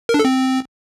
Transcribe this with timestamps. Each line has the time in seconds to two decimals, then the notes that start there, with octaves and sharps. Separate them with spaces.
0.09 A#4
0.14 D4
0.19 A4
0.25 C4